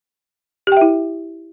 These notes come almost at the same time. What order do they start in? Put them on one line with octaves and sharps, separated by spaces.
G4 G5 E5 E4